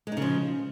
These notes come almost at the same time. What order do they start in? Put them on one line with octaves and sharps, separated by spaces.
G#3 D#4 C#3 F3